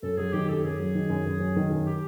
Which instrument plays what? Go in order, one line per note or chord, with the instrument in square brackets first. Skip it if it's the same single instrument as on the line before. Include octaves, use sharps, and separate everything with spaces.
[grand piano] F#2 [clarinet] A4
[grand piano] F#3 [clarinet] G#4
[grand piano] D#3 [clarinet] G4
[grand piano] F#2 [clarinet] A4
[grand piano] F#2 [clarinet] G#4
[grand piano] F#3
D#3
F#2
F#2
F#3
D#3
F#2
[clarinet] G4